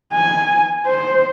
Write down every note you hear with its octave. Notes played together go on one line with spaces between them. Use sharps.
G#5
C5